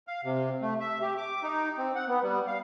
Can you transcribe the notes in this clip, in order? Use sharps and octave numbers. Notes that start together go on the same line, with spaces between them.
F5
C3
A3
E5
G4
D6
D#4
C4
F#5
B3
G3
F5